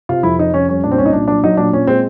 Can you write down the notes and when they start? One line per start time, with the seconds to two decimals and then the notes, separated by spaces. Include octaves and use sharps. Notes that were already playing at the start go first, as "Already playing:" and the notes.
0.09 C3 F4
0.23 F2 E4
0.38 C3 D#4
0.54 F2 C#4
0.69 G3 C#4
0.84 A#2 D4
0.91 C4
0.98 C2 C#4
1.05 D#4
1.13 A#2 D4
1.28 F#3 D4
1.43 F#3 D#4
1.57 A#2 D4
1.73 A#2 C#4
1.87 G#3 C4